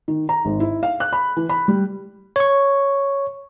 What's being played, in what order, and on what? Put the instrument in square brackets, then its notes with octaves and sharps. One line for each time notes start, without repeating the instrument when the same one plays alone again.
[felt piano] D#3
A#5
G#1
E4
F5
F#6
B5
E3
B5
G3
[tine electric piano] C#5 C#6